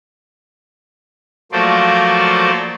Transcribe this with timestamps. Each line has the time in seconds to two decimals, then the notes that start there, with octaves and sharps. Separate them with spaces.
1.52 F3 F#3 A3 A#3 C5 D5